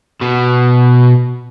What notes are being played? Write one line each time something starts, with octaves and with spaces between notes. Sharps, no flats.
B2